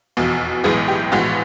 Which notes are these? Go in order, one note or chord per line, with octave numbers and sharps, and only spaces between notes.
F1 E2 B2
B1 A2 E3 G#3 B3 G#4
G4
A#1 A2 E3 G#3 B3 F#4